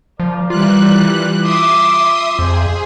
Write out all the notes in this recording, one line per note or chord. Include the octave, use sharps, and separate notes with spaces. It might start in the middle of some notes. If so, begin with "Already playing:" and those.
F3 A#4 D5
E3 G3 F4 F#6
E5 C6 D6 D#6
F2 G#4 C5